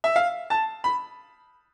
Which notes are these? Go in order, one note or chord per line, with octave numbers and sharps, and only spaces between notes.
E5
F5
A5
B5